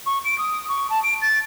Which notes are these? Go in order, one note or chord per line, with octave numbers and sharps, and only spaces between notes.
C#6
D7
D#6
C#6
A5
D7
A6